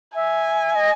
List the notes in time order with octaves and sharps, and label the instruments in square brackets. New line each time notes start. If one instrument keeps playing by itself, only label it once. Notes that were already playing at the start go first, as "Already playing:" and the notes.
[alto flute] E5 [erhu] G#5
[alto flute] D#5